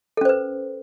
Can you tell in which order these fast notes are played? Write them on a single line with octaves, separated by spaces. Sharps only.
A4 C#4 C5 B4